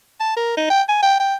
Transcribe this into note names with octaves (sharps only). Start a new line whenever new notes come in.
A5
A#4
D#4
G5
G#5
G5
G5